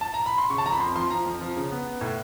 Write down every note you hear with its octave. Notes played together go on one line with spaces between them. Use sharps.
A5
A#5
B5
C6
C#3 C#6
A5
F2 A#5
B5
F2 C6
F3 C6
F3 A#5
F2
F3
C#3
B3
B3
A2